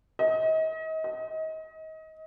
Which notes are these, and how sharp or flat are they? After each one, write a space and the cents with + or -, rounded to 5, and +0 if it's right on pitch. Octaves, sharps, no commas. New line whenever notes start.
D#5 +35
D#5 +30